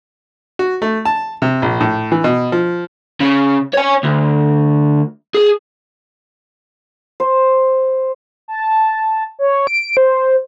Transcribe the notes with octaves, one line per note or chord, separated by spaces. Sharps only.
F#4
A3
A5
C3
A#1
A2
E3
B2
F3
C#3
C#5 G#5
D2
G#4
C5
A5
C#5
D7
C5